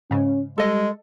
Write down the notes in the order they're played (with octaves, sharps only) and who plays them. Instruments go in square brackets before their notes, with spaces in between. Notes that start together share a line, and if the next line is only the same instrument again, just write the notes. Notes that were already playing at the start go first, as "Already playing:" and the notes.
[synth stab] G#2 C#3 [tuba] C#4
[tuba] G3 [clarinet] G#3 [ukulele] A4 D#5